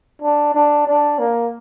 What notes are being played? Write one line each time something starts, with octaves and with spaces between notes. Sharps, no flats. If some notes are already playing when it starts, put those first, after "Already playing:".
D4
D4
D4
A#3